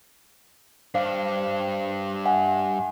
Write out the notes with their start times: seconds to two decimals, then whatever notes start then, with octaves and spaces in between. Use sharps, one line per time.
0.95 G2 D4 C5 F5
2.25 E5 F#5 G#5